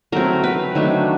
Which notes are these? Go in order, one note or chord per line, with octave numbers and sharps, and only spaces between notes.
F#3 A3 C4 A#4
B4
D#3 F#3 A3 D4